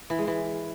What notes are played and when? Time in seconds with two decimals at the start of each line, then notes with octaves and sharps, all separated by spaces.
0.10 E3
0.19 G#3
0.27 E3